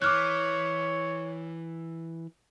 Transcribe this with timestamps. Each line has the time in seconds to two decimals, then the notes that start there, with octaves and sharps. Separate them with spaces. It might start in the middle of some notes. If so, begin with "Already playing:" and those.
0.02 E3 C#5 D6 F6 F#6